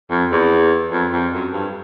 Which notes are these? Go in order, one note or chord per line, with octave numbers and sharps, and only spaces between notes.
F2
E2
F2
F2
F#2
G2